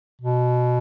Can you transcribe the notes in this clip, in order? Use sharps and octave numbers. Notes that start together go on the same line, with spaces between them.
B2